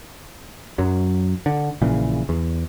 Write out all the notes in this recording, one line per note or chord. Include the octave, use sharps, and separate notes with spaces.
F#2 F#3
D3
A#1 A#2 C#3 E3
E2